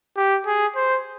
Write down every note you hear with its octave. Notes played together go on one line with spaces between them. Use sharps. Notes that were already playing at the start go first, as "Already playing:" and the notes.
G4
G#4
C5